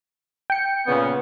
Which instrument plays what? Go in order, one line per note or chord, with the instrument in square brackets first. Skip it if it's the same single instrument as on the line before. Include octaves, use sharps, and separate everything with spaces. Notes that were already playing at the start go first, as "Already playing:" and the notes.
[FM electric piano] G5 C#7
[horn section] A#2 C#3 B3